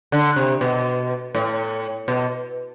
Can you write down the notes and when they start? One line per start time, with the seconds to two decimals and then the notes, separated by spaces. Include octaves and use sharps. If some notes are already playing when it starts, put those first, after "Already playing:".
0.12 D3
0.36 C3
0.61 B2
1.35 A2
2.08 B2